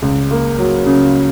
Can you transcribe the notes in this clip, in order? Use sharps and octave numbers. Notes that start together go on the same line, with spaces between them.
C#2
A#3
F#3
C#3